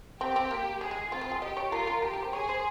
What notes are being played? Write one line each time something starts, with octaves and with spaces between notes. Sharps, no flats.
C4 G4
C4
A#3
G3 G#4
G#3
C4 F4
C4
G#4
G4 D#5
C#5
F4 A#4
A#4
G4 A#4
A#4
C5
G#4 C#5
C5